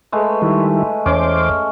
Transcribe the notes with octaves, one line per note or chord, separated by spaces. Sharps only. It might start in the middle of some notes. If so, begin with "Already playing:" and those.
G#3 A3 B4
D#3 G3 E4
E2 C#4 C5 D6